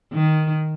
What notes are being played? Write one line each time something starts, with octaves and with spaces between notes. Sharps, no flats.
D#3